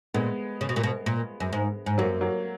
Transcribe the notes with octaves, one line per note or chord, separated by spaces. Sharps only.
A#2 G#3 B3
C#3
B2
A#2
B2
A#2
F#2
G#2
G#2
F#2 F#3 A#3
F#3 A#3